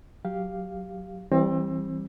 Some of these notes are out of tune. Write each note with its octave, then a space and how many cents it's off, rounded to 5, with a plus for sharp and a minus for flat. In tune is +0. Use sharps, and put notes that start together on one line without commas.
F#3 +0 G4 +0 F5 +0
E3 +0 G3 +0 C4 +30